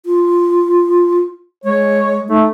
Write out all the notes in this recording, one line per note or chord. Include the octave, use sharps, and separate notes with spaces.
F4
G#3 C#5
A3 D#4